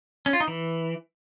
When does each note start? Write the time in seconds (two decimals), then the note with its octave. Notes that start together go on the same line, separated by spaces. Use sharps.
0.26 C#4
0.33 F4
0.40 D#4
0.48 E3